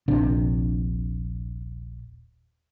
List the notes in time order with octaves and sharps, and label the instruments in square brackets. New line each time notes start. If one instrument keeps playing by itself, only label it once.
[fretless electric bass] D#1 A#1 C3 D4